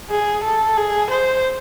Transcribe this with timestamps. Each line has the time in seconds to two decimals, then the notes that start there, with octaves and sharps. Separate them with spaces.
0.10 G#4
0.44 A4
0.77 G#4
1.10 C5